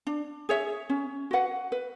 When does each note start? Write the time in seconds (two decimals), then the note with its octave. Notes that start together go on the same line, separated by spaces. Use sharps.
0.07 D4
0.49 G#4 C#5 E5
0.90 C#4
1.31 F#4 B4 F#5
1.72 B4